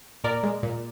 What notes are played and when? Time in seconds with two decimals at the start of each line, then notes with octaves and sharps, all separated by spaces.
0.24 A#2 A#4 D5
0.43 G#3
0.63 A#2